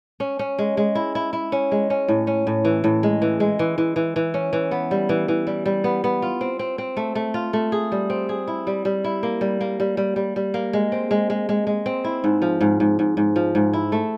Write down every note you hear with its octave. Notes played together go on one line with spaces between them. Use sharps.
C#4
C#4
G#3
G#3
E4
E4
E4
C#4
G#3
C#4
A2
C#4
A2
E3
A2
G#3
E3
G#3
E3
E3
E3
E3
C#4
E3
B3
G3
E3
E3
G3
G3
B3
B3
F4
C4
C4
C4
A3
A3
F4
A3
G#4
G3
C4
G#4
E4
G3
G3
E4
A#3
G3
A#3
G3
G3
G3
G3
A#3
G#3
C4
G#3
G#3
G#3
G#3
C4
E4
G#2
F3
G#2
G#2
G#2
G#2
F3
G#2
E4
A3